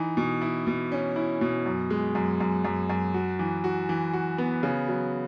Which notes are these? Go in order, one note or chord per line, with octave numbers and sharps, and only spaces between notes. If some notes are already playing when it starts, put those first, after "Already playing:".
Already playing: E3 D#4
B2
E4
B2
C#4
E4
B2
F#2
G#3
F#2
F#2
F#2
F#2
F#4
E3
F#4
E3
F#4
B3
C#3
F#3